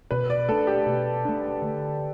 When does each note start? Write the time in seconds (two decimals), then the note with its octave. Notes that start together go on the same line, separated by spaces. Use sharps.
0.11 B2 B4
0.30 D5
0.49 A3 D4 A4
0.67 G4
0.86 B2
1.25 A3 D4
1.62 D3